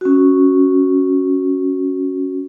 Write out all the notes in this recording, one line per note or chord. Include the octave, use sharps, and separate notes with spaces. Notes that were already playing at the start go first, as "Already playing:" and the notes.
C#4 F#4